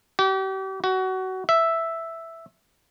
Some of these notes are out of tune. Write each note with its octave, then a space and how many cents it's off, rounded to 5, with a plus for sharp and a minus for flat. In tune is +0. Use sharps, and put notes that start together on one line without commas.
G4 -40
F#4 +20
E5 +0